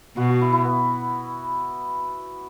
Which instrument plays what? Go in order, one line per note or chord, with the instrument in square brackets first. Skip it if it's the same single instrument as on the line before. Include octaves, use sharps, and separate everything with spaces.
[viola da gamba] B2 [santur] F#4
[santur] F#4
E4
E4
B3